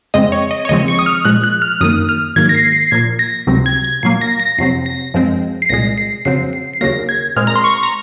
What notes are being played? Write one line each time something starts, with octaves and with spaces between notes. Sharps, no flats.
F2 C#3 G#3 C4 D#5
C#5
D#5
C#5
D#2 C#3 F3 G#3 C4 D#5
C#6
D#6
F6
A#2 F3 G#3 F#6
F#6
F6
F#2 D#3 A#3 D#6
F6
G#2 D#3 F#3 A#3 G#6
A#6
C7
C7
A#2 F3 A#3 G#6
A#6
C#2 C3 F#3 C4
G#6
G#6
A#2 F#3 A#3 C7
A#6
A#6
F2 C3 F#3 C4 C7
A#6
F#2 F3 G#3 C4
C7
C2 A#2 G#3 A#6
C7
F2 C#3 F#3 C4 C7
C7
C7
D#2 C#3 F#3 A#3 A#6
G#6
A#2 G#3 C4 F6
A#5
C6
C#6
A#5